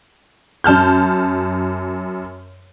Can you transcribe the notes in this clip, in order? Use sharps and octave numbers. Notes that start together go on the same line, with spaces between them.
F#2 A5 F6 G6